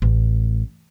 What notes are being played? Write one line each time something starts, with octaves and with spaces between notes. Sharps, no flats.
A1